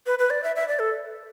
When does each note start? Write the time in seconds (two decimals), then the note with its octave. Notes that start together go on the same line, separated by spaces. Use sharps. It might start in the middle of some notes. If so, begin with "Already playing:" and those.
0.06 B4
0.19 B4
0.30 D5
0.44 E5
0.56 E5
0.68 D5
0.79 A4